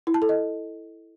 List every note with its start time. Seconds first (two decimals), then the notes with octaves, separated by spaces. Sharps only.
0.07 E4
0.14 A5
0.22 A4
0.29 D#5